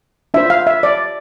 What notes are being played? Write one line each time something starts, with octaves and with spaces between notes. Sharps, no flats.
D4 F4 C5 E5
F5
E5
D5